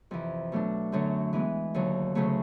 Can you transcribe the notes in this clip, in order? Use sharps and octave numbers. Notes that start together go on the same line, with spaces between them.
F2 C3 E3
B2 F#3 A3 D4
F#2 D3 F#3 A3
E3 G#3 B3
D#2 D3 F#3
D2 C#3 F#3 A3